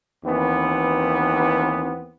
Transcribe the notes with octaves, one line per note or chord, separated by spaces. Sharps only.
D#2 E3 B3 C4